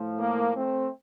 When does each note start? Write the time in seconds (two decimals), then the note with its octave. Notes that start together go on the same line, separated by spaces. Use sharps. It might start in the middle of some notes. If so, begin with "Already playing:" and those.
Already playing: A2 F3
0.20 A#3
0.55 A3 C4